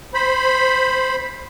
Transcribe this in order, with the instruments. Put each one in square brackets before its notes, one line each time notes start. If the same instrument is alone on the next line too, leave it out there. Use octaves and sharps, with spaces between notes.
[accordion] C5 B5